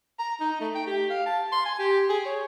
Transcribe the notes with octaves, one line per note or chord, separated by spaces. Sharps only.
A#5
D#4
A3
G5
G4
F5
A5
C6
G#5
G4
G#4
C#5